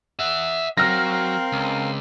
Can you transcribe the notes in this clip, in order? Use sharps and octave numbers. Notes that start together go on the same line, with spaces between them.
E5 F#5
F#3 C4 A#4 F5 F6 A#6
C#2